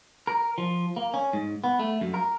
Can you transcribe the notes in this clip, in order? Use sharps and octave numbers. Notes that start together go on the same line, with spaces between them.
A#4
F3
A#3
C#4
G#2
B3
A3
F#2
A#4